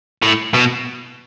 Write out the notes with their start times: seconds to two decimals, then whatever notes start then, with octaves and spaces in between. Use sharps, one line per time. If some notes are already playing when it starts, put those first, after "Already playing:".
0.23 A2
0.54 B2